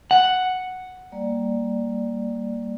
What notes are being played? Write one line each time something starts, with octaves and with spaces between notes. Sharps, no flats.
F#5
G3 A#3 D5